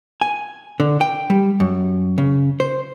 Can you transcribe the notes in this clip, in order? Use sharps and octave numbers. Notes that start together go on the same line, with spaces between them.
G#5
D3
G5
G3
F#2
C#3
C5